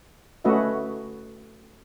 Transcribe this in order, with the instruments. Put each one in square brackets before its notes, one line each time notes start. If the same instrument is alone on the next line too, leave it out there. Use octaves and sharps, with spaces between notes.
[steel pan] A3 C#4 F#4 B4 D#5 E5